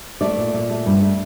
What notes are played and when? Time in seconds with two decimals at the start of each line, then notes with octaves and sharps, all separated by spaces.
0.21 A3 D5
0.37 A#2
0.53 A#2
0.69 A3
0.86 G2
1.01 A3